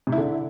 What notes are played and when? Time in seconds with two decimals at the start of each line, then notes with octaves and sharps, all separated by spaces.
0.07 C3
0.12 E4
0.18 D3